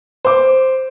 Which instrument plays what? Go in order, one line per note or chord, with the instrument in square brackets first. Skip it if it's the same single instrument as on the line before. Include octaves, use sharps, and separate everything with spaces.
[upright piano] C5 D6